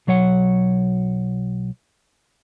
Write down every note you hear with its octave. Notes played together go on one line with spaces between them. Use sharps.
B1 F#3 C#5 F#5